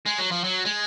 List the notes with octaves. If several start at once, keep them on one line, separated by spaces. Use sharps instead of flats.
G#3
F#3
F3
F#3
G#3